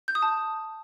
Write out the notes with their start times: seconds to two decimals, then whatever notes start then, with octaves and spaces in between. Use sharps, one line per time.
0.08 G6
0.15 D#6
0.22 A5